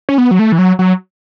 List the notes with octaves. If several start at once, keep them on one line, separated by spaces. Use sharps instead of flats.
C#4
B3
F#3
A3
E3
F#3
F#3